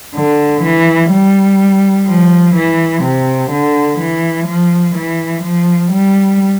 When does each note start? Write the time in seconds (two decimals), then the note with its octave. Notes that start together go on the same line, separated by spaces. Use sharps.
0.15 D3
0.63 E3
1.11 G3
2.07 F3
2.55 E3
3.03 C3
3.51 D3
3.99 E3
4.47 F3
4.95 E3
5.43 F3
5.91 G3